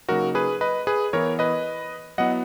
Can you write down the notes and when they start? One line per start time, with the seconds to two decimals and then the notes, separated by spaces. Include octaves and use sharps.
0.09 C#3 F#3 A#3 D#4 F#4 A#4
0.35 G#4 B4
0.61 B4 D#5
0.87 G#4 B4
1.13 E3 B3 E4 A#4 C#5
1.39 B4 D#5
2.18 F#3 B3 E4 D#5 F#5